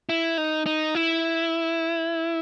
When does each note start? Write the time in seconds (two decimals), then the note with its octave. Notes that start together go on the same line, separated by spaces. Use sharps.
0.09 E4
0.38 D#4
0.66 D#4
0.95 E4